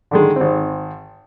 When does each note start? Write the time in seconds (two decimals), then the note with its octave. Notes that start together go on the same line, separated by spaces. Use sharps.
0.11 D3 D#3 G#3
0.36 G#1 C4